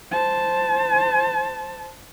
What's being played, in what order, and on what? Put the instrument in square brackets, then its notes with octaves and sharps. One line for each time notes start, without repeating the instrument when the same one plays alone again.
[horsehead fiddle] C5 A5